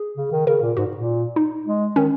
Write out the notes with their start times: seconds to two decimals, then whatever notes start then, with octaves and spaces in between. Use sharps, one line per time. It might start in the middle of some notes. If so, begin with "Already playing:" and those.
Already playing: G#4
0.17 C#3
0.32 D#3
0.47 C#3 A#4
0.61 A#2
0.77 G#2 F#4
0.97 A#2
1.36 D#4
1.67 G#3
1.96 D#3 C#4